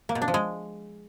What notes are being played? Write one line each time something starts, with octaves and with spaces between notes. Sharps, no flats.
A#3
B2
D4
F3
G#3